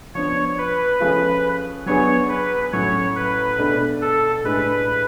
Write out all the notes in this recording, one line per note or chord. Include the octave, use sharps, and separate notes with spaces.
F3 B3 D4 C#5
B4
F3 A3 C#4 F4 G#4
F#3 B3 D4 G#4 C#5
B4
A2 F#3 C#4 C#5
B4
B2 A3 D4 G#4
A4
A2 G#3 D4 G#4 B4